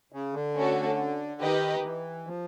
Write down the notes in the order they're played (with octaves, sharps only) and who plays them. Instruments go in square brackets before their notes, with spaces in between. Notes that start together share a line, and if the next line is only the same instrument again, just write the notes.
[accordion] C#3
D3
[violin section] A3 C#4 F#4 A4
[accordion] D#3 [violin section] D#4 G4 B4 D#5
[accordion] D#3
E3
F3